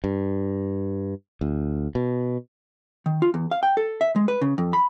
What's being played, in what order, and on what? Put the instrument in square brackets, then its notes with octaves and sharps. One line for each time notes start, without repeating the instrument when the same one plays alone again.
[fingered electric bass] G2
D2
B2
[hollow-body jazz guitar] D#3
F4
E2
F5
G5
A4
E5
G#3
B4
C#3
F2
B5